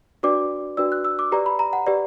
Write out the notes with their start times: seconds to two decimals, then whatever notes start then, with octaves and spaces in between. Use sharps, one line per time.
0.23 D4 F#4 B4 D5 D6
0.77 D4 F#4 B4 D5 E6
0.92 F#6
1.05 E6
1.19 D6
1.32 G4 B4 D5 A#5
1.46 B5
1.59 A#5
1.73 F#5
1.86 G4 B4 D5